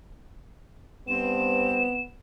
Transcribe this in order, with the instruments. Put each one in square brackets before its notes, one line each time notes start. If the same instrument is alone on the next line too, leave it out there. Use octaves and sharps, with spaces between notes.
[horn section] G2 C4 [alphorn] B3 [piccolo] E7